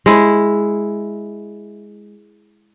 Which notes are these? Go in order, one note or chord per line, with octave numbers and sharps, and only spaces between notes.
G#3 E4